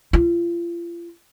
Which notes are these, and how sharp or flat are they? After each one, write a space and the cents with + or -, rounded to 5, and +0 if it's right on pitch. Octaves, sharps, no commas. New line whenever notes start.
F4 -35